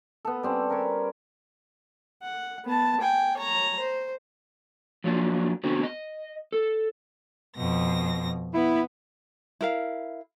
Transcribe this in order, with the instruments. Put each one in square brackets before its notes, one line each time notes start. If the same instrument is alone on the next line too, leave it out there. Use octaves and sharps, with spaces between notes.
[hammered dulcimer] B3 A4
G3 C4 C#4
A#4 B4 C#5
[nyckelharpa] F#5
B3 A5
G5 G#5
C#5 A#5
C5
[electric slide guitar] F3 F#3 A#3 D4
D3 B3 C4 D4 F#4
D#5
A4
[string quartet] F2 B2 A#6
[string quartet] B3 [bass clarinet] E4
[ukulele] E4 A#4 F5